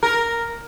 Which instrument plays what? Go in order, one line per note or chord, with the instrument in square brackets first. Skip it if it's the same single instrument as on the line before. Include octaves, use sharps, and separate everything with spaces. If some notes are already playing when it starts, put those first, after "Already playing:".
[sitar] A#4